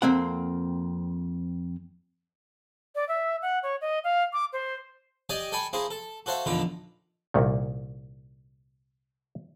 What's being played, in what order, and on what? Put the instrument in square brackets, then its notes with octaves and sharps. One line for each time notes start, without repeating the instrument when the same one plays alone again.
[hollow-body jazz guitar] F2 A#3 C4 F#5
[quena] D5
E5
F#5
C#5
D#5
F5
D6
C5
[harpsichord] G4 D5 D#5 G5 G#5
A4 G5 G#5 B5
A#3 E4 G#4 C5
A4
F#4 A4 C5 E5 F5
A#1 E2 D3 D#3 F4 B5
[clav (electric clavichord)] C2 A#2 D#3